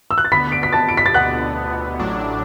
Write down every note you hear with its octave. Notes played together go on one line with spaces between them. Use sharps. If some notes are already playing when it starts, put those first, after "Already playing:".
E6
F#6
A6
D2 D3 B3 B5 B6
D7
B6
A5 A6
D7
B6
A6
D2 D3 B3 F#5 F#6
A1 A2 F#3 D4